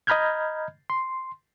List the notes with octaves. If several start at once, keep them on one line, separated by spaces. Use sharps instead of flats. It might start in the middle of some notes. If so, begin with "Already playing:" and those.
D#5 A#5 B5 F6 G6 G#6
C6